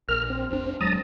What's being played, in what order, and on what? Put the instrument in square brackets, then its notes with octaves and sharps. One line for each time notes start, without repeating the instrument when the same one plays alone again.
[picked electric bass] A#1 [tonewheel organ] A#4 F6
[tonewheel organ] C4
[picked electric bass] F1 D4
[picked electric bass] D#1 F#3 G#3 [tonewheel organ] A5 A#5 D#6